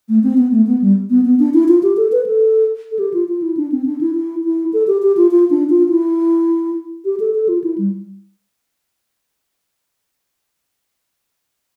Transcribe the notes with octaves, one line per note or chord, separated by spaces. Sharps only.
A3
C4
B3
A3
B3
G3
B3
B3
D4
E4
F4
G4
A4
B4
A4
A4
G4
F4
F4
E4
D4
C4
D4
E4
E4
E4
A4
G4
G4
F4
F4
D4
F4
E4
G4
A4
A4
F4
E4
G3